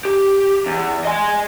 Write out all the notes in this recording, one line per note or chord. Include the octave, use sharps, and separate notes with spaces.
G4
E2
D#5 G#5